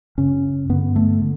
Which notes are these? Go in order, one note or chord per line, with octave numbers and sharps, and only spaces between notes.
F#2 C#3 C#4
G2 D3 B3
A3
D3